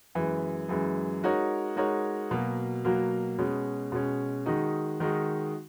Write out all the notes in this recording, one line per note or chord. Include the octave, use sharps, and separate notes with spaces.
F#2 E3 G#3
F#2 E3 G#3
G#3 D#4 F#4 A#4 C#5
G#3 D#4 F#4 A#4 C#5
B2 F#3 A#3
B2 F#3 A#3
B2 G#3 C#4
B2 G#3 C#4
D#3 G#3 D#4 F#4
D#3 G#3 D#4 F#4